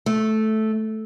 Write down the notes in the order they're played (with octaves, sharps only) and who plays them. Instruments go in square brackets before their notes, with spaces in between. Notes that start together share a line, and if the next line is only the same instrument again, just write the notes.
[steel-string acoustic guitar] A3